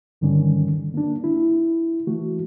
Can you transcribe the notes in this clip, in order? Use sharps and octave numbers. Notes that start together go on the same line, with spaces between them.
G2 D3 D#3 G3 C#4
A#3 D4
E4
E3 A3 F#4